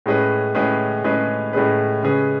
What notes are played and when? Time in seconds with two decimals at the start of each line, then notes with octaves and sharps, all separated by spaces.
0.06 A2 G#3 C#4 G#4 B4
0.55 A2 G#3 C#4 G#4 B4
1.04 A2 G#3 C#4 G#4 B4
1.53 A2 G#3 C#4 G#4 B4
2.03 C#3 G#3 C#4 G#4 B4